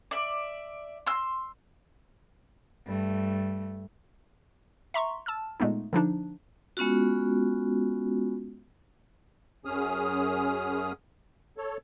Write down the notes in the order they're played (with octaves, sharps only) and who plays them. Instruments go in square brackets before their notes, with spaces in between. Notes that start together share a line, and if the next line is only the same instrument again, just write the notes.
[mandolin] D5 E5
C6 E6
[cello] G2 A3
[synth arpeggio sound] E5 A#5 C6 C#6
A5 E6 F6
A#2 G#3 A3 B3 D#4
D3 F3 D4 D#4
[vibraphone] G#3 B3 C#4 F4 F#4
[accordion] F#2 C#4 G#4 D#6 F6
A4 C#5